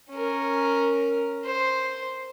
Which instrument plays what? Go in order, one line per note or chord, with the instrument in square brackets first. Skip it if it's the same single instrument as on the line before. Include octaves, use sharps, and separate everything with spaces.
[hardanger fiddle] C#4 A#4
C5